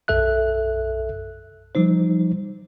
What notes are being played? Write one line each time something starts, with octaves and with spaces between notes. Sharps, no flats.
B1 F#2 A4 E5 F#6
F3 G3 D#4 C5